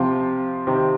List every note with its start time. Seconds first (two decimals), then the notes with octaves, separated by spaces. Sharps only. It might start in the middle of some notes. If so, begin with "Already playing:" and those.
Already playing: C3 F3 C4 F4
0.67 C3 D#3 C4 G4